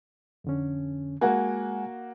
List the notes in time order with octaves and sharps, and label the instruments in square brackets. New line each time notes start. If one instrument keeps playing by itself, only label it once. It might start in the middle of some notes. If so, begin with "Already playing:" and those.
[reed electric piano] F2 D3 C#4
[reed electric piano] G#3 F#5 G#5 [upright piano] A#3 F#4